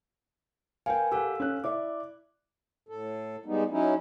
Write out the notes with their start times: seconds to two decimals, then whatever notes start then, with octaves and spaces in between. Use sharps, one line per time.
0.86 A#4 B4 F5 G5 G#5
1.12 G4 A4 F5 F#5 E6
1.40 C#4 F#6
1.64 E4 D5 E5 D6
2.89 A2 A4
3.46 G3 G#3 B3 D#4
3.70 F#3 C#4 D#4 E4